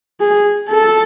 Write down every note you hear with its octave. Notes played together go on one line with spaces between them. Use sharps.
G#4
A4